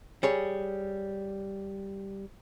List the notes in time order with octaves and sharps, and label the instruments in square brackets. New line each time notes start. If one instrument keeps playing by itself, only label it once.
[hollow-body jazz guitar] G3 G#4 C#5